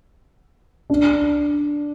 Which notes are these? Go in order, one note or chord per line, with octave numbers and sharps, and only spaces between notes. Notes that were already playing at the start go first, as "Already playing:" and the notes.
D4